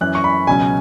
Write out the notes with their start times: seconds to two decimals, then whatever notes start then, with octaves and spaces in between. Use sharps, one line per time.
0.01 F#2 E3 C#4 F#6
0.15 C#6
0.24 B5
0.47 C#2 B2 F#3 C#4 G#5